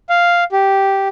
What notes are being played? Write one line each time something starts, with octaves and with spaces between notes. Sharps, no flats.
F5
G4